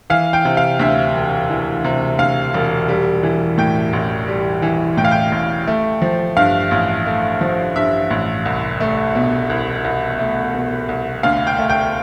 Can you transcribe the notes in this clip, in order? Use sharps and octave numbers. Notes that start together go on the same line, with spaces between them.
E3 F5
G5
C3
F5
D2 E5
E1
E3
C3
D2 F5
E1
G3
E3
A2 G5
A1
G3
E3
A2 G5
F5
G5
A1
A3
F3
G2 F5
A1
A3
F3
G2 E5
A1
C2
A3
B2
C2
C2
A3
B2
C2
D2 F5
G5
A3
G5